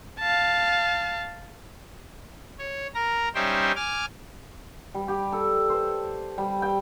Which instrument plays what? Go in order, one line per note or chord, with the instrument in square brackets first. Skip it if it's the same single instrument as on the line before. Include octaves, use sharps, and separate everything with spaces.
[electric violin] F5 A5
[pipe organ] C#5
A#4 A#5
G3 C#4 D#4 C5 E5 G5
G#5 D6 F6
[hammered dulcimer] G3
G4
A4
C5
G3
G5